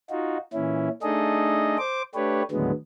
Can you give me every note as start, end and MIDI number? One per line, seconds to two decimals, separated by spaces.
0.10 0.38 63
0.10 0.38 65
0.10 0.38 66
0.54 0.89 46
0.54 0.89 52
0.54 0.89 61
0.54 0.89 64
1.03 1.77 57
1.03 1.77 62
1.03 1.77 63
1.03 1.77 68
1.03 1.77 69
1.03 1.77 75
1.78 2.02 72
1.78 2.02 86
2.15 2.42 57
2.15 2.42 62
2.15 2.42 67
2.15 2.42 71
2.15 2.42 73
2.51 2.71 39
2.51 2.71 45
2.51 2.71 50
2.51 2.71 54
2.51 2.71 56
2.51 2.71 59